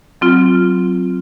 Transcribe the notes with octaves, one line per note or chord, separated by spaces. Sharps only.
F#3 C4 F4